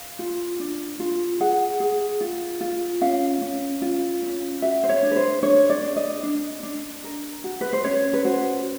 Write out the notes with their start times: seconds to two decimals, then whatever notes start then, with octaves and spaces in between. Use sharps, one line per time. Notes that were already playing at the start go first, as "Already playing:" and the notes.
Already playing: F5
0.19 F4
0.60 D4
1.00 F4
1.40 G#4 F#5
1.80 G#4
2.21 F4
2.61 F4
3.01 C#4 F5
3.42 C#4
3.82 F4
4.22 C#4
4.62 F#4 E5
4.83 C5
4.89 C#5
5.03 D4
5.11 B4
5.16 C5
5.43 D4 C#5
5.70 D5
5.83 D4
5.96 D#5
6.23 D4
6.63 D4
7.04 A#4
7.44 F#4
7.61 B4
7.73 C5
7.84 C#4 C#5
8.13 B4
8.25 F#4 C5